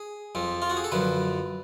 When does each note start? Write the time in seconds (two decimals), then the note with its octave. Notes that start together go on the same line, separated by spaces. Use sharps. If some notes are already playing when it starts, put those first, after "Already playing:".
Already playing: G#4
0.35 F2 F3
0.62 F4
0.70 F#4
0.77 G#4
0.84 A4
0.92 F#2 D3 F3 B4